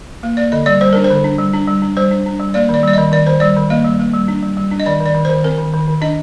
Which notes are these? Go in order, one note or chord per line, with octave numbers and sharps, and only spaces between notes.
A#3
A#3 D5
D3 D#5
G3 D5
G3 C5
D4 A#4
C5
D3
D4
G3
D4
G3
D4
G3 C5
D4
D4
G3
A#3 D5
D#3 D5
G3 D5
D#3 D#5
D#3 D5
D#3 C5
G3 D5
D#3
A#3 D#5
G3
A#3
G3
D4
G3
G3
D4
D#5
D#3 D5
D#3
D5
D#3
D#3 C5
C4 A#4
D#3
D#3
D#3
D4 D#5